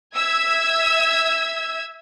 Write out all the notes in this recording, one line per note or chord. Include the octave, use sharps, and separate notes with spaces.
E5 E6 G#6